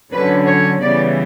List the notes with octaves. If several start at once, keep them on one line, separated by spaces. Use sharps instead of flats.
D3 F#3 C#4 B4
C#5
C#3 E3 G3 B3 D5